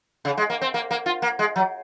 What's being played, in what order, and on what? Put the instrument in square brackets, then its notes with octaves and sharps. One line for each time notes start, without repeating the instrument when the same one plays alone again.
[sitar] C#3
G#3
A#3
C4
A#3
A#3
F4
A#3
G#3
F#3